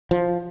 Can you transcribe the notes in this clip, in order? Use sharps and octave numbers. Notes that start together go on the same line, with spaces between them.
F3